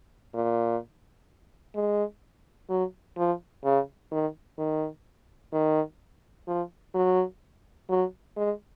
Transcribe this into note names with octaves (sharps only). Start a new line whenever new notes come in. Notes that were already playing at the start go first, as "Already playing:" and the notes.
A#2
G#3
F#3
F3
C#3
D#3
D#3
D#3
F3
F#3
F#3
G#3